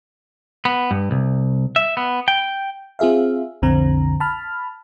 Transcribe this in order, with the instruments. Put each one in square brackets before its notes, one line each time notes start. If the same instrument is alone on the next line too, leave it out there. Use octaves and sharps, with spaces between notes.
[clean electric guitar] B3
G2
C2
E5
B3
G5
[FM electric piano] C4 F4 G#4 E5 F5
B1 F2 D3 C4 A#5
A5 B5 F6